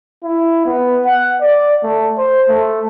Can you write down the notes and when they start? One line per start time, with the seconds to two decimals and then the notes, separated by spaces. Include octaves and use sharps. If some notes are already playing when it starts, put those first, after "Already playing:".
0.24 E4
0.66 B3
1.06 F#5
1.40 D5
1.83 A3
2.18 C5
2.49 A3